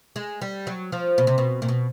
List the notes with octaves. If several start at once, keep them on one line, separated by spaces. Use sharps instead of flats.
G#3
G3
F#3
F3
B2
C3
B2
A#2
B2